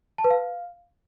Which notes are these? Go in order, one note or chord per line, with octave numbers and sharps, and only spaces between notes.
A5
B4
F5